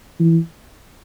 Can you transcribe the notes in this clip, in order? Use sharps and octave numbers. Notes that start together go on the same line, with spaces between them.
E3